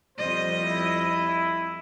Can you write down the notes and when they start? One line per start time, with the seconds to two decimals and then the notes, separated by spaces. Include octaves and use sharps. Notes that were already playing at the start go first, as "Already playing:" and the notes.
0.18 F2 G3 C5 D#5
0.60 E4